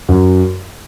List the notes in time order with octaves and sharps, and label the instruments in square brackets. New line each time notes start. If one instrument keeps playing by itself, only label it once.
[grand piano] F#2